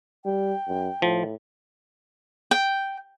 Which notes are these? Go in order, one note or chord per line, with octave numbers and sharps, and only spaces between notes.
G3 G5
F#2
A2 F3
G5